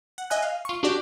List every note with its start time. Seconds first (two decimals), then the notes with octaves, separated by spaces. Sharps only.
0.18 F#5
0.30 D#5 E5 G#5 F#6
0.42 F5
0.65 F4 C#6
0.83 D4 F#4 G4 D5